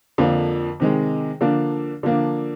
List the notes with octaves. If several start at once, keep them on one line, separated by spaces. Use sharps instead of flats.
F2 D3 F3 A#3
C3 D#3 G#3
D3 F3 A#3 D4
D3 F3 A#3 D4